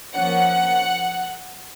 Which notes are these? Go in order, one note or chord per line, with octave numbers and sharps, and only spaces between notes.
F3 A#3 C#4 F#5